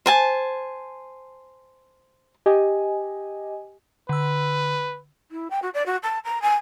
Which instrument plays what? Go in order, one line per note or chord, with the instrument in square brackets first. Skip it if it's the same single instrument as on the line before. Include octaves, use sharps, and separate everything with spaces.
[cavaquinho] C5 G#5 A5
[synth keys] G4 D#5 G#5
[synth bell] D3 E6 [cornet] B4
[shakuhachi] E4
G5
F#4
D5
F#4
A5
A#5
G#5